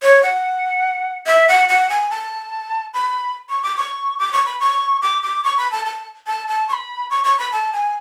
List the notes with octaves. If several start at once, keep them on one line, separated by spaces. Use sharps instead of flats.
C#5
F#5
E5
F#5
F#5
G#5
A5
B5
C#6
D6
C#6
D6
C#6
B5
C#6
D6
D6
C#6
B5
A5
A5
A5
A5
C#6
B5
C#6
C#6
B5
A5
G#5